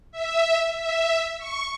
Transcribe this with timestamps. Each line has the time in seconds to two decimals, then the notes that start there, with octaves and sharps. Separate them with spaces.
0.12 E5
0.77 E5
1.38 C#6